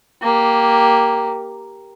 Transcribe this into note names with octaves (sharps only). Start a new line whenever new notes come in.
A#3 G4